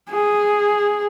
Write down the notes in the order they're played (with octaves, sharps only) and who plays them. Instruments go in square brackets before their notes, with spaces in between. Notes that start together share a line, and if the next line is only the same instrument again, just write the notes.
[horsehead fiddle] G#4